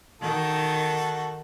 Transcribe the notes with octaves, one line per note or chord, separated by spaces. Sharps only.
D#3 F#4 A4